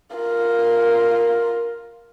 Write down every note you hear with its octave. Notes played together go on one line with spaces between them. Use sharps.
F4 A#4